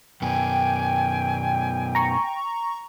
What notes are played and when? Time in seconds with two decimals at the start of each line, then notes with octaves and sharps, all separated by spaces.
0.22 F#2 B2 G5 G#5
1.95 A#5 C#6